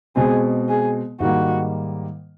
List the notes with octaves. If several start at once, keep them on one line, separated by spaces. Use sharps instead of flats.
B2 G#3 C4 G#4
G#4
G#2 D#3 G3 A#3 F#4